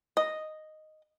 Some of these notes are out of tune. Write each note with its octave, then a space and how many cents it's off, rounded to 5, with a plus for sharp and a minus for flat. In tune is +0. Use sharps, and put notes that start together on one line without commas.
D#5 -5